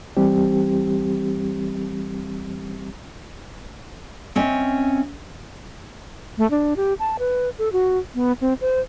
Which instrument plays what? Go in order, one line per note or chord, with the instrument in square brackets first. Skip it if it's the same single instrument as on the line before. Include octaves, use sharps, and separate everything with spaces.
[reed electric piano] E3 G3 C4 G4
[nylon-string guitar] C4 C#4 D#5 E5
[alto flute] A3
D4
G4
A5
B4
A4
F#4
B3
C4
C5